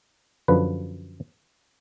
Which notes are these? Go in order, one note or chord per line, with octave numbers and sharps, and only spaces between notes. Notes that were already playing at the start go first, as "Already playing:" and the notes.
F#2 D3 F3 B4